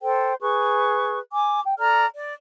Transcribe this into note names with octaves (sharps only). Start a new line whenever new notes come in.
A4 C5 G5
G#4 B4 C#6
G#5 D6
G5
A4 D5 A#5 F6
D5